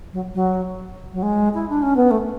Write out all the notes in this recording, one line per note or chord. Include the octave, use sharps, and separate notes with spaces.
F#3
F#3
F#3
G#3
E4
D4
C#4
B3
A3